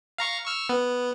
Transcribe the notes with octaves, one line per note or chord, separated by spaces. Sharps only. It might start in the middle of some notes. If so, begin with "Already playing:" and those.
F5 A#5 C#6
C#6 E6 F6
B3